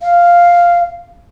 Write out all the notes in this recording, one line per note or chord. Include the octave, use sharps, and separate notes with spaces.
F5